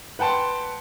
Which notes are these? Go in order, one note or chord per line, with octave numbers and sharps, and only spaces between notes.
B4 F#5 G5 A5 C6